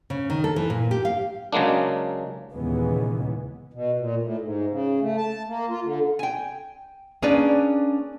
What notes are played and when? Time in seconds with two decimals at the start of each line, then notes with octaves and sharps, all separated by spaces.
0.10 C#3
0.30 D#3
0.44 A4
0.56 E3
0.70 A#2
0.91 G4
1.05 F5
1.52 C#3 F#3 G#3 A#3 D4
2.53 D#2 A#2 C#3 E3 G#3 B3
3.73 B2
3.99 A#2
4.22 A2
4.41 G#2
4.70 C#3
5.01 A3
5.17 A5
5.48 A#3
5.69 F4
5.84 D3
6.19 G5 G#5
7.22 A#3 C#4 D4 G#4 B4 D5